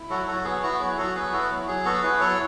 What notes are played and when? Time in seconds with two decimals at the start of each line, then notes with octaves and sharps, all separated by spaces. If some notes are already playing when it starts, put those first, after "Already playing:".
Already playing: E4
0.10 F#3 F#4 A4
0.27 F#3 F#4 A4
0.44 B3 G#4
0.62 E4 F#4
0.79 F#3 G#4
0.98 F#3 F#4 A4
1.15 B3 G#4 B4
1.32 E4 F#4 A4
1.50 F#3
1.67 F#3 G#4
1.85 B3 F#4 A4
2.02 E4 G#4 B4
2.20 F#3 A4 C#5